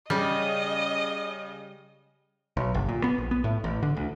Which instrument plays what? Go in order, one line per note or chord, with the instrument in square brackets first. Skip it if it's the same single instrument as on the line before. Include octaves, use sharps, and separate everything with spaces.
[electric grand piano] C#3 [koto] G3 [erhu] D#5
[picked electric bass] B1
G1
A#2
B3
A#1
B3
A2
A1
D3
D2